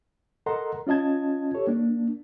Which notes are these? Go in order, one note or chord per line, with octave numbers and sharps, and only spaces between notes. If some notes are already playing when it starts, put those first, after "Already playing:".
A4 A#4 D#5 F#5 A#5 C6
C#4 F4 D#5 A5 G#6
G4 A4 C#5
A#3 D4